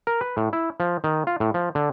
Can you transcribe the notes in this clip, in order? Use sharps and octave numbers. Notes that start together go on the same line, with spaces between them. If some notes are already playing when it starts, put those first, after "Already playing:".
A#4
B4
A2
E4
F3
D#3
F4
A2
F3
D3